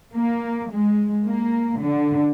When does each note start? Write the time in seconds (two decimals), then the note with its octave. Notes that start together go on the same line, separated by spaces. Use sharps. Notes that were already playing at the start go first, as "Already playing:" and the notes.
0.12 A#3
0.71 G#3
1.26 A#3
1.81 D3